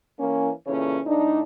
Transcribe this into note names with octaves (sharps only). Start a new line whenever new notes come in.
E3 A#3 C#4
A#2 C#3 E3 C#4 A4 C#5
A2 D4 D#4